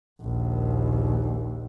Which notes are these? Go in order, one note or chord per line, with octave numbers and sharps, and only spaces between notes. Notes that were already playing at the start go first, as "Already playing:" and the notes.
A#1 D#2